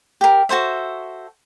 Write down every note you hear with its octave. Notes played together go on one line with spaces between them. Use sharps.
G4 A#4
F#4 A4 C5 E5